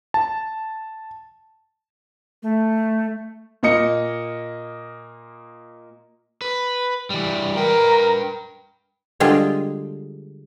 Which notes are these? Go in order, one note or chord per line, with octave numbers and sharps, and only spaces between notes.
A5
A3
A#2 A#3 D#5 C#7
B4
E3 G3
A#4 B4 G5
D3 G3 G#3 F4 G#4